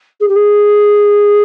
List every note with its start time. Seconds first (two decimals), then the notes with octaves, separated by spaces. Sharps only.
0.20 G#4
0.28 G4
0.35 G#4